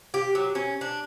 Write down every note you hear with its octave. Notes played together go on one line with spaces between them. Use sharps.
G4
F#3
C#4
D4